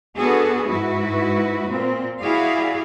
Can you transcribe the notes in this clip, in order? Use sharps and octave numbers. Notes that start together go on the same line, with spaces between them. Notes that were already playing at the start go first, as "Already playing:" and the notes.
B3 D4 F#4 G#4 A4
G#2 E4 F#4 B4
A#2 C4
E4 F#4 G#4 D5 F5